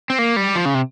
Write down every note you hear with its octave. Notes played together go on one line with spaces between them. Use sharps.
C4
A#3
G3
F3
C#3
C3